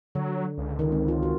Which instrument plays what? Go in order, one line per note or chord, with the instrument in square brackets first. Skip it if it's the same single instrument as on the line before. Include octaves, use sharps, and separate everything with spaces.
[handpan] D3 [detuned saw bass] F#3
[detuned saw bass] C#2
[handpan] D#3
C4
F4
F#4